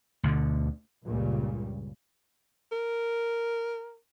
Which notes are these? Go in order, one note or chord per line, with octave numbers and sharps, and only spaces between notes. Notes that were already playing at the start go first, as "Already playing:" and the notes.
D2 B2 D3
C#2 G2 A#2 C#3 G3
A#4